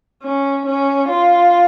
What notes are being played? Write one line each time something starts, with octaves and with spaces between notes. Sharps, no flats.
C#4
C#4
F4